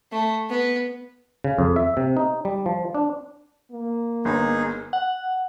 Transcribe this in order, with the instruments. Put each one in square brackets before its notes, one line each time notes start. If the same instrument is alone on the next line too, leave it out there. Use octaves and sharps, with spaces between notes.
[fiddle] A3
B3
[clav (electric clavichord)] C#3
F2
E5
C3
D#4
G3
F3
D4
[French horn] A#3
[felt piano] G1 [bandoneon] D#4 G#4
[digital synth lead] F#5